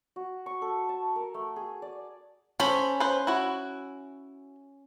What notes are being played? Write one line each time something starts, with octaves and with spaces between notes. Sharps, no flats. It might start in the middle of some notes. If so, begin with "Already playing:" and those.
F#4
C#6
A4
A5
A#4
A3
G#4
D5
C#4 A4 C5 B5
B4 C5
E4 F#4